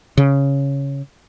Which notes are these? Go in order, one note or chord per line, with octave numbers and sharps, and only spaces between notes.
C#3